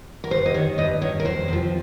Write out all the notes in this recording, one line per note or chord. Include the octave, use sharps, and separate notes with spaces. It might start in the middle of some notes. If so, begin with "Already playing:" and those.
A#4
G2 C5
D#5
D#3 C#5
G2 D#5
D#3 C#5
A#4
F2 C5
C3 F3